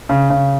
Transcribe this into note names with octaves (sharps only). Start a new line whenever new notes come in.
C#3
C#3